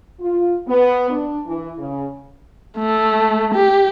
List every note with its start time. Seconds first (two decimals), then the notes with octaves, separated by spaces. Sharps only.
0.21 F4
0.68 B3
1.11 D4
1.47 E3
1.78 C#3
2.78 A3
3.55 G4